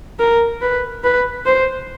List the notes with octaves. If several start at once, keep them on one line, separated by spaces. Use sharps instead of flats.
A#4
B4
B4
C5